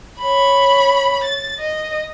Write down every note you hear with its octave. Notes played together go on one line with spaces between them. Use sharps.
C#5 B5
A6
D#5